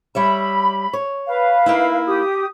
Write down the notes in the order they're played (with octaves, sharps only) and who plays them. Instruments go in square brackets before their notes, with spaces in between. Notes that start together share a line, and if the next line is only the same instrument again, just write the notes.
[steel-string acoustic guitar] G3 C#5 E5 [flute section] B5
[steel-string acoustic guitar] C#5
[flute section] B4 F5
[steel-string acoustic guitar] A#3 D#4 E4
[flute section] G4 D#6